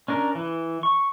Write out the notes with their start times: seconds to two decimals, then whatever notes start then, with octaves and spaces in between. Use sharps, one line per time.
0.08 C#4 D4 A#4
0.35 E3
0.83 C#6